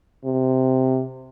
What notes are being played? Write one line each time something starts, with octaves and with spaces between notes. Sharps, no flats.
C3